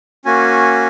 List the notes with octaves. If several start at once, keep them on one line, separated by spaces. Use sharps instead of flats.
A#3 C#4 F#4 G#5